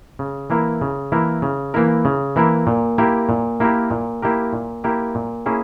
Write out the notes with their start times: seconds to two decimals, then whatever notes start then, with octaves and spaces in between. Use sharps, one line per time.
0.19 C#3
0.50 E3 A#3 E4 A#4
0.81 C#3
1.12 E3 A#3 E4 A#4
1.42 C#3
1.74 E3 A#3 E4 A#4
2.05 C#3
2.36 E3 A#3 E4 A#4
2.67 A#2
2.98 A#3 E4 G4 A#4
3.29 A#2
3.60 A#3 E4 G4 A#4
3.91 A#2
4.22 A#3 E4 G4 A#4
4.53 A#2
4.84 A#3 E4 G4 A#4
5.15 A#2
5.46 A#3 C#4 E4 G#4